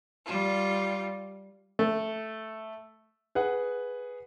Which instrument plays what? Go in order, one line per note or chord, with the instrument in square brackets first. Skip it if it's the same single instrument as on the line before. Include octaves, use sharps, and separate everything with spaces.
[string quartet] G3 F4
[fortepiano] A3
[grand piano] G#4 B4 F#5